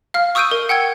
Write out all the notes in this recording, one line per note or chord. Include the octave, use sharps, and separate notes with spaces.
F5 F6
C#6 D#6 E6 G6 D7 D#7
A#4
F#5 G5 E6 G#6